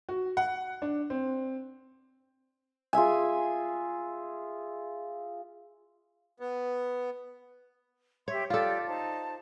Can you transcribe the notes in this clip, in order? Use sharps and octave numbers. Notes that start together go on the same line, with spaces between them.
F#4
F#5
D4
C4
F4 G#4 E5 G#5
B3
G4 C#5 E5 C6
F4 G4 A4 D5
D#4 C5 A5